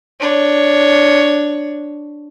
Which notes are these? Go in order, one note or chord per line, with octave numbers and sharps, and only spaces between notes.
D4 C#5